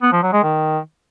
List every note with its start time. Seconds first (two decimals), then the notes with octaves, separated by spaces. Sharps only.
0.02 B3
0.12 F3
0.23 F#3
0.33 G#3
0.43 D#3